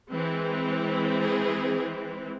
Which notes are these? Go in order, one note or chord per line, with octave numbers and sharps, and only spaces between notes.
E3 G#3 C4
G#4